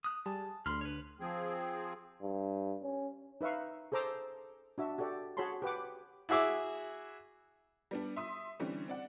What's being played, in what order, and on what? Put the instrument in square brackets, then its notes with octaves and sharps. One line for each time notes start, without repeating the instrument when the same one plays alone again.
[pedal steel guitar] D#6 F#6
[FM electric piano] G3 G#4 [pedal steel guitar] A5
[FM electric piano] D2 D3 [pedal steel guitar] B5 C6 F6
[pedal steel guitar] B4 C#5
[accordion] F3 C4 G#4
[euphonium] G2
C#4
[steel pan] D#4 B4 E5 F5 C#6
G#4 A4 C5 A#5 D6 E6
D4 F#4 E5
F#4 G4 A4 D5
F#4 G#4 C#5 A5 B5 C6
G4 B4 F#5 D6
[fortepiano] E4 F#4 G#4 E5 D6
[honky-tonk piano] G3 B3 D4
E5 C6 D#6
D3 E3 G3 C4 C#4
C4 D5 F#5